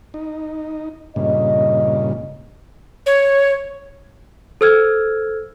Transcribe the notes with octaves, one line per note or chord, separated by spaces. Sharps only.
D#4
G2 A#2 C#3 D#5
C#5
A4 C5 E6 F6 G#6